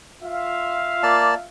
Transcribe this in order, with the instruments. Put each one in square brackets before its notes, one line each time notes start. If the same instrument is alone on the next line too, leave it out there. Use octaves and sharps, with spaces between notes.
[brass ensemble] F4 E5 F5
[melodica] A#3 D5 A5